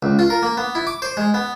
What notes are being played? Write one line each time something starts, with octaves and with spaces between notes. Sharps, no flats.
C#2
F4
A#4
A#3
B3
E4
D6
C5
G#3
B3